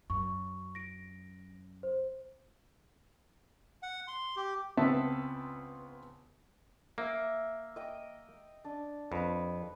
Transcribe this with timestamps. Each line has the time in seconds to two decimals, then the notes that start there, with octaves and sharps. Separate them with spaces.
0.10 F#2 C#6
0.75 A#6 D7
1.83 C5
3.83 F#5
4.08 C6
4.36 G4
4.77 C#2 B3 C4 E5 A5
6.98 A#3 E5 G5
7.76 D#5 G5
8.64 D4
9.12 F2 B4